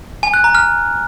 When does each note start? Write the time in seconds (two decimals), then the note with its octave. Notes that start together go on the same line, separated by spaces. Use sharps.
0.23 G#5
0.34 F#6
0.44 A#5
0.55 F6